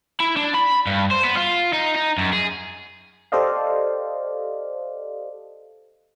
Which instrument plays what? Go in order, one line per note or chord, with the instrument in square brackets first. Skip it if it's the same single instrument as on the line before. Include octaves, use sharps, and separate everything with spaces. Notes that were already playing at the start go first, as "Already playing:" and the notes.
[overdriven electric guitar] E4
D4
B5
G2
C5
B3
F4
D#4
D#4
F#2
G#4
[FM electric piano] G4 A4 C5 D5 D#5 F5